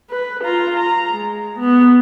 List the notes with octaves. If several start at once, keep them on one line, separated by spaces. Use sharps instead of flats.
B4
F4 A#5
A#5
G#3
B3